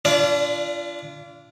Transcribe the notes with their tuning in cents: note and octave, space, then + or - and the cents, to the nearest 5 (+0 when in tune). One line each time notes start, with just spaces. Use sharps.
D4 -30 F4 -30 D5 +0